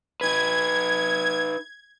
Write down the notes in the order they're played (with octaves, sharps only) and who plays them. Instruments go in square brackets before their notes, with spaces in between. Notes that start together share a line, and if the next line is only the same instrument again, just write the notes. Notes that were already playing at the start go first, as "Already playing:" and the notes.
[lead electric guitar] D#4 B4 [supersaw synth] G#6